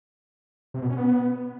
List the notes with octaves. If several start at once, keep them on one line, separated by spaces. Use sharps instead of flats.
C3
B2
C#4
B3